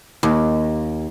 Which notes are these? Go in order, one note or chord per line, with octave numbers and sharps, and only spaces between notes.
D#2